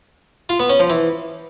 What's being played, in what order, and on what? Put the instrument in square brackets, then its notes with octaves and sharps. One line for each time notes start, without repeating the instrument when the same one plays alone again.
[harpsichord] F4
B3
C#4
F3
E3